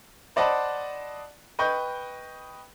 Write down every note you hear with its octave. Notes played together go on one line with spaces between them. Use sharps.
C5 D5 D#5 F#5 A5 B5
B4 D#5 G5 C#6 G6